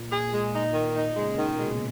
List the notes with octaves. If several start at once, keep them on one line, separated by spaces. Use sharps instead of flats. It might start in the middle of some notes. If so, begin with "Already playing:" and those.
Already playing: A#2
G#4
G#3
D#4
D#3
D#4
C#3 G#3
D#3
B2
G#3